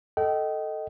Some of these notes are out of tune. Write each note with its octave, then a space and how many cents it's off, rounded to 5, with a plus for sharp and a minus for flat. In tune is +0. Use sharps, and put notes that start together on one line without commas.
A4 +0 D#5 +0 G5 -30